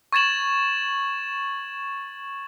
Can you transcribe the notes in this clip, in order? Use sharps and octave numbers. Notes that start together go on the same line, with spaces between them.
C#6 G#6 A6 E7 F#7